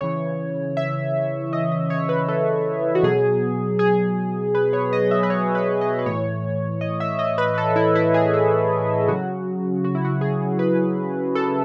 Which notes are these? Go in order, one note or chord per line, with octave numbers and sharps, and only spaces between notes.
C#3 E3 C#5
E5
D#5
D#5
C#5
B4
A4
F#4
B2 F#3 G#4
G#4
B4
C#5
D#5
E5
B4
C#5
B4
D#5
B4
A2 E3 C#5
D#5
E5
D#5
B4
A4
E4
E4
G#4
E4
C#3 F#3 F#4
F#4
E4
F#4
G#4
B4
A4